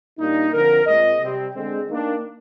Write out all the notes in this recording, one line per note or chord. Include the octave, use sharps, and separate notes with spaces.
A#2 G3 A#3 D4 D#4
D3 F3 C4 A#4
A#2 G#3 C4 D#5
C3 G3 C4
D3 G#3 C4
D#3 A#3 D4